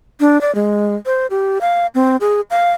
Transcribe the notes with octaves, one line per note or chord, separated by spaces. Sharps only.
D4
D5
G#3
C5
G4
F5
C4
G#4
F5